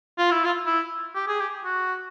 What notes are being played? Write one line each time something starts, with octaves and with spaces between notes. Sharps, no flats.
F4
E4
F4
E4
G4
G#4
G4
F#4